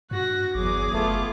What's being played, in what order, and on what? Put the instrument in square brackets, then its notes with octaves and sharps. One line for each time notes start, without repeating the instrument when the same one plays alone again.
[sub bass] G2 [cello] F#4 [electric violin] F#6 A#6
[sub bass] G1 [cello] E2 F#3 [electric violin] G#4 D6
[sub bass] F#1 [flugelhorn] A3 [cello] B3 F4